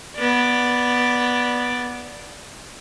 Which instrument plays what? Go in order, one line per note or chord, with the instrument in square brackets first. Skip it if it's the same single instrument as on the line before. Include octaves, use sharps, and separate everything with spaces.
[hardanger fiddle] B3 D5